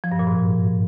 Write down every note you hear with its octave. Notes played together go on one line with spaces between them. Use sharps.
F3
G2
A#2
G#2